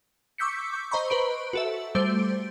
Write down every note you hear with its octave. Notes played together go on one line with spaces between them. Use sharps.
C#6 D6 E6 G6 B6 C#7
C5 D#5 A#5 B5 C#6
B4 C5 D7
F#4 A4 E5
G3 A3 C5 D7